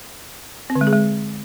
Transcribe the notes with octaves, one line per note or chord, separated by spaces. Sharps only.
C4
D3
G#3
G#4
G#3